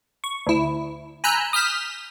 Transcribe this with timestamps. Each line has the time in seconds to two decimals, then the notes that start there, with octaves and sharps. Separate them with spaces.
0.24 C#6
0.46 D2 E4
1.24 G#5 A#5 B5 E6 F#6 G6
1.53 D#6 F6 G6 B6 E7